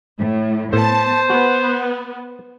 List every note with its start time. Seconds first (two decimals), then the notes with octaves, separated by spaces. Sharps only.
0.18 A2
0.73 A2 B3 C5 A5
1.30 B3 F#4